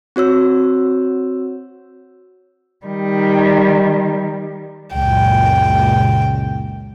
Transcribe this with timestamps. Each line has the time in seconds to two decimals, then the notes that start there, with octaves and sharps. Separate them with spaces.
0.16 C4 F#4 C#5 E6
2.86 D#3 G3
4.94 C#2 F#2 A#2 G5